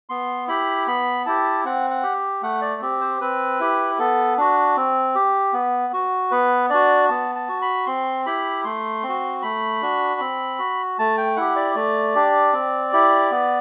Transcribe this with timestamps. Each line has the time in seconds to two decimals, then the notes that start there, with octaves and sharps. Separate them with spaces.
0.09 B3 C6
0.48 E4 G4 B5
0.87 B3 B5
1.26 E4 G4 A5
1.65 C4 F#5
1.90 F#5
2.03 G4
2.42 A3 F#5
2.62 D5
2.81 C4 G4
3.01 C5
3.21 C4 B4
3.60 E4 G4
3.99 B3 A4
4.38 D4 F#4
4.77 C4
5.15 G4
5.53 B3
5.93 F#4
6.31 B3 B4
6.70 D4 F#4 D5
7.09 B3 A5
7.35 A5
7.49 F#4
7.62 B5
7.87 C4 C6
8.26 E4 G4 B5
8.64 A3 C6
9.03 C4
9.09 F#4
9.42 A3 B5
9.82 D4 F#4
10.20 C4
10.59 F#4
10.99 A3 A5
11.18 G5
11.36 E4 G4 F#5
11.56 D5
11.75 A3 D5
12.15 D4 G4
12.53 C4
12.93 E4 G4
13.31 B3